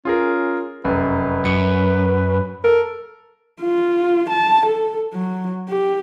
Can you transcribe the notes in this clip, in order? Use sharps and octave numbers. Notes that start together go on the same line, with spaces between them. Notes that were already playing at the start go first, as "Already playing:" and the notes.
C#4 F4 G#4 A#4
F1 F#2 B4
F#2 C#7
A4 A#4
F4
A5
A4
F#3
G4